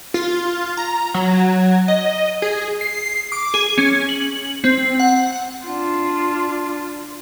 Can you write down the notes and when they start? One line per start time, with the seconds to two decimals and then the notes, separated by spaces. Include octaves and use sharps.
0.14 F4
0.77 A#5
1.14 F#3
1.88 D#5
2.42 G#4
2.81 C7
3.32 D6
3.54 G#4
3.78 C#4
4.09 F#7
4.64 C4
4.99 F#5
5.66 D4 F4